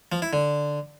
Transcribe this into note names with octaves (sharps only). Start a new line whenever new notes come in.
F3
E4
D3